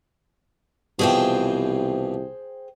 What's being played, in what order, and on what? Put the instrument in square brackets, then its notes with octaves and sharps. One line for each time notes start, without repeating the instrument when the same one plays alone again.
[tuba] C2 [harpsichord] B2 E3 F3 [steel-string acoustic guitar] G#4 C5 G5